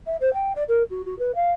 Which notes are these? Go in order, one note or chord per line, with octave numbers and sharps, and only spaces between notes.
E5
C5
G5
D5
A#4
F#4
F#4
B4
F5